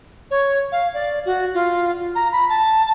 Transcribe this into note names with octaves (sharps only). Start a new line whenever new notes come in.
C#5
F5
D5
F#4
F4
A#5
B5
A5